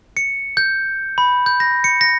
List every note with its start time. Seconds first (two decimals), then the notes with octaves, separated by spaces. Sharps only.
0.17 C#7
0.57 G6
1.18 B5
1.46 G6
1.60 A#6
1.84 C#7
2.01 A#6